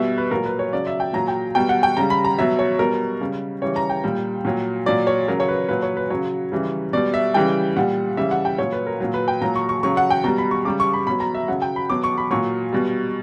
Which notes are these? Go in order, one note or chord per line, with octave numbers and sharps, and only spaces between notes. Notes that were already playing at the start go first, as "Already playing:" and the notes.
Already playing: B2 G3 E5
B4
A#2 F#3 A#4
B4
C#5
C#3 F#3 D5
E5
G5
A#2 F#3 A#5
G5
B2 G3 G5
F#5
G5
C#3 G3 A#5
B5
A#5
B2 F#3 E5
C#5
B2 G3 A#4
C#3 G3
C#3 E3 G3 C#5
A#5
G5
A#2 G3
A#2 F#3
A#2 F#3 D5
C#5
C#3 F#3 A#4
C#5
B4
A#2 F#3 B4
C#5
B4
C#3 F#3 C#5
C#3 E3 G3
B2 G3 D5
E5
C#3 E3 G3 G5
A#2 G3 F#5
C#3 E3 G3 E5
F#5
G5
A#2 F#3 C#5
B4
A#4
A#2 F#3
B4
G5
A#2 F#3 A#5
C#6
C#6
C#3 F#3 C#6
F#5
G5
B2 G3 A#5
B5
C#6
C#3 G3 D6
C#6
B5
B2 F#3 B5
A#5
E5
C#3 F#3 F#5
G5
B5
B2 F#3 D6
C#6
B5
A#2 F#3 C#6
B2 G3